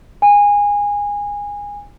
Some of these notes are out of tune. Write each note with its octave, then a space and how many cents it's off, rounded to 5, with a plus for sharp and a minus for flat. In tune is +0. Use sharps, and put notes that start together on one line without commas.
G#5 -20